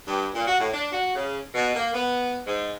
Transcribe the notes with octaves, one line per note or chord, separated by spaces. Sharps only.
G2
A#2
F#4
A2
D4
F#4
C#3
B2
A#3
B3
G#2